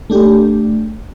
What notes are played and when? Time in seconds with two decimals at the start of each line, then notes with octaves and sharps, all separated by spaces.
0.10 A3 D4 G4